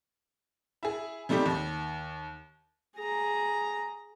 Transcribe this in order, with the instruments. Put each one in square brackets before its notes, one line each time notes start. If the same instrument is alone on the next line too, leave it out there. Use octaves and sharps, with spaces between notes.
[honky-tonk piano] E4 G#4
C3 G3 A3 D#4 G4
D#2
[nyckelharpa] G#4 A#5